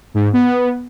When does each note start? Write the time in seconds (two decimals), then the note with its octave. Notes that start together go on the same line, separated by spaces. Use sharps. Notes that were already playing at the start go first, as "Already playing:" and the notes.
0.14 G#2
0.33 B3